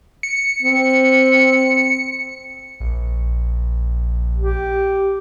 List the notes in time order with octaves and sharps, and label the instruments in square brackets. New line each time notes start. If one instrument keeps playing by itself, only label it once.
[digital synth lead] C#7
[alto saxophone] C4
[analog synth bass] A#1
[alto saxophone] G4